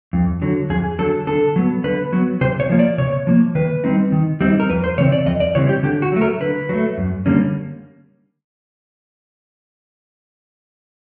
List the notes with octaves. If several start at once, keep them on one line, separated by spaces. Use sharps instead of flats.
F2
D3 F#3
F2 G#4
D3 F#3 A4
D3 A4
F#3 B3
D3 B4
F#3 B3
C3 C5
C#5
F3 A#3
D5
C3 C#5
F3 A#3
D#3 B4
G3 C4 D#4
D#3
G3 C4 D#4
A#4
F2 B4
C5
C#3 E3 C4 C#5
D5
F2 D#5
D5
C#3 E3 G3 C4 C#5
G4
D3 G4
F#4
F#3 A3
A#4
D3 B4
F#3 A3
F#2
D3 G3 A#3 C#4